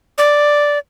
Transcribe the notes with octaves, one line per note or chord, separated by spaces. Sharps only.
D5